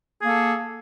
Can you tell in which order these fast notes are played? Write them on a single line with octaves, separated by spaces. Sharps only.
G#4 A#3 A4